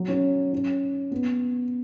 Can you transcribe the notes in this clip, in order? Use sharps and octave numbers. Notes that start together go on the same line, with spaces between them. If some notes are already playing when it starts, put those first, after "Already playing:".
Already playing: F#3
C#4
C#4
B3